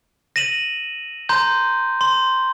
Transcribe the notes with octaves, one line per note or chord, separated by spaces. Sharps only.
A#6 D#7 E7 F#7
A#5 C6 G6
C6